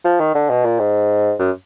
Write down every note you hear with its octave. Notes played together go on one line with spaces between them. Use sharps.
F3
D#3
D3
B2
A#2
G#2
F#2